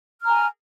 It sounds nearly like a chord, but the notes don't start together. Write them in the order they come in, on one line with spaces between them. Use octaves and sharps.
F6 A#5 G#5